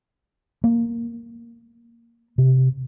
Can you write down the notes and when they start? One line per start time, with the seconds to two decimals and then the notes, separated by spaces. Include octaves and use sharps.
0.64 A#3
2.38 C3